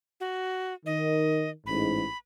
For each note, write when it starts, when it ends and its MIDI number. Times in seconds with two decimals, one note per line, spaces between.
0.20 0.74 66
0.86 1.51 51
0.86 1.50 75
1.66 2.04 33
1.66 2.04 44
1.66 2.17 83